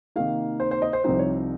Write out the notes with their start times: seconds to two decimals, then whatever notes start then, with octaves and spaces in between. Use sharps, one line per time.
0.16 C3 D#3 A#3 D#4 F5
0.60 C5
0.71 C5
0.82 D#5
0.93 C5
1.04 C2 C3 F3 C4 D#4 C5
1.19 C#5